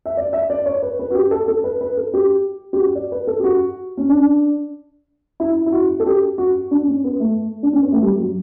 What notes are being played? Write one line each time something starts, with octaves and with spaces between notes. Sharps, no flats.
E5
D5
E5
D5
C#5
B4
B4
F#4
G4
A4
A4
B4
B4
A4
G4
G4
F#4
D5
B4
A4
G4
F#4
C#4
D4
E4
E4
F#4
A4
G4
F#4
D4
C#4
B3
A3
D4
C#4
B3
A3
G3
F#3